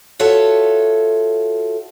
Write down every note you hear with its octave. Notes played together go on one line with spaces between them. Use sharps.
F4 F#4 A4 C#5 E5